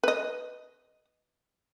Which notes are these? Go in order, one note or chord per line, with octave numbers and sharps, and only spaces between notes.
B4 D#5